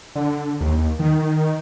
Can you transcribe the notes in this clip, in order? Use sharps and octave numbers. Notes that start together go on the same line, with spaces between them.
D3
D#2
D#3